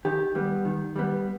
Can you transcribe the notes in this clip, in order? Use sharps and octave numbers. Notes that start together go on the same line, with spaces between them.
D#3 G4
G3 B3
D#3
G3 B3